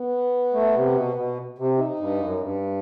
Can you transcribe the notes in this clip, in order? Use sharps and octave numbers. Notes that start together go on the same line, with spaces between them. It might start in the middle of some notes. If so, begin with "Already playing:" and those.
Already playing: B3
A3
C3
B2
B2
C3
D#4
G2
F#2
G2